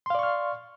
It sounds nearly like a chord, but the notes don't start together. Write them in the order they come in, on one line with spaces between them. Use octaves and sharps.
C6 F5 D5 C#6 F6